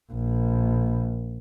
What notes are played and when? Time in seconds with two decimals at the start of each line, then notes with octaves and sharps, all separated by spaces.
0.12 A#1